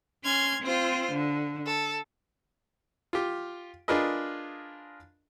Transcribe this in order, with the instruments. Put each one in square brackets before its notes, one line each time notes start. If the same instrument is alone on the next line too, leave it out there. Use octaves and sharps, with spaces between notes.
[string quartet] C#4 C6 F6 G#6
C4 F4 C5
D3
A4
[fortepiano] F4 G4
D4 F4 G#4 A#4 B4 D#5